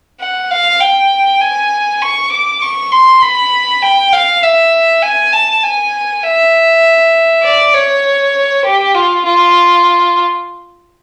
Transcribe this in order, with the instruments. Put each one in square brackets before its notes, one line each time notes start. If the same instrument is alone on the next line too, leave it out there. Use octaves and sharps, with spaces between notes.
[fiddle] F#5
F5
G5
G#5
C#6
D6
C#6
C6
B5
G5
F5
E5
G#5
A5
G#5
E5
D5
C#5
G4
F4
F4